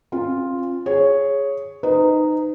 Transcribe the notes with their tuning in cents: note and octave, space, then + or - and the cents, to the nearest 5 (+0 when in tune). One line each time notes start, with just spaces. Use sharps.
C4 +40 F4 +0
G#4 +0 C#5 +0
D#4 -15 B4 +40 D#5 +0